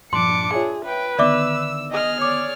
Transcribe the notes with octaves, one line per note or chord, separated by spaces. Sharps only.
G2 A#2 F3 D4 C6 D6 C#7
F4 G#4 C#5 E5
B4 G5
D3 D#3 B3 D5 E5 D6 E6
G#4 D#5 F6
C#5 D5 D6